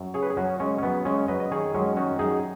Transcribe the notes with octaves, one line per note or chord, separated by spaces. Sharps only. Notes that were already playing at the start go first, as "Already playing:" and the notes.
Already playing: F#2
C#3 G#4 C#5
B4
G#4
F#2 C#4 F#4
C#3 G#3 C#4
C#4
F#2 B3
C#3 G#3 C#4
F#2 B4 D#5
D#5
D#3 G#4 C#5
F#2 G#3 C#4
D#3 C#4 F#4
F#2 D#4 G#4